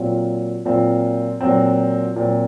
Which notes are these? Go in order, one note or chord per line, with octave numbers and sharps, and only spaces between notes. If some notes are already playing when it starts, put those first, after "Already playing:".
Already playing: A#2 F#3 C4 F4
A#2 F#3 C4 F4
A#2 F#3 C4
A#2 F#3 C4